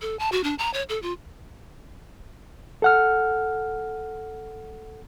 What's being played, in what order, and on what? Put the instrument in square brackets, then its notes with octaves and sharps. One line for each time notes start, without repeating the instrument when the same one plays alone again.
[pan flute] A4
A5
F#4
D4
A#5
C#5
A4
F4
[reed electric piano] A4 F#5 F6